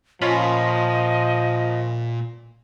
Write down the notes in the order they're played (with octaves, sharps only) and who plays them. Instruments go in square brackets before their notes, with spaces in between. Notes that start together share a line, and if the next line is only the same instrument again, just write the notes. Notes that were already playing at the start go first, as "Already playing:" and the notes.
[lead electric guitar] A#2 C6 [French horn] F3 [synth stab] C#4 F4 B5 [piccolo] D#5